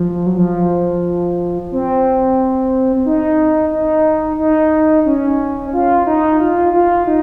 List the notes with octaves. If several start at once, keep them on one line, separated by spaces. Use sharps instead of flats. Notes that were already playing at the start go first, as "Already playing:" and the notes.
Already playing: F3
F#3
F3
C4
D#4
D#4
D#4
C#4
F4
D#4
F4
F4
D#4